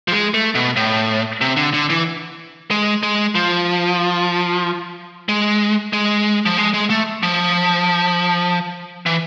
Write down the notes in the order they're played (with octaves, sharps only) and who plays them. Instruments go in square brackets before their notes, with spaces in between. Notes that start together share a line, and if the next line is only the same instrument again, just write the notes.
[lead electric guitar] F3
G#3
A3
B2
A2
C3
D3
D3
E3
G#3
G#3
F3
G#3
G#3
F3
G#3
G#3
A3
F3
E3